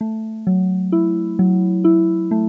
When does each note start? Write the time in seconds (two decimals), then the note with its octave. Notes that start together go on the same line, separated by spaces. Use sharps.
0.01 A3
0.47 F#3
0.92 E4
1.39 F#3
1.84 E4
2.31 A3